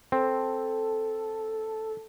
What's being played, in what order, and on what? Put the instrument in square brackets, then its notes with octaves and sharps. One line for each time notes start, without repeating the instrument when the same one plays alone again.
[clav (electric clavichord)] C4 [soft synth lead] A4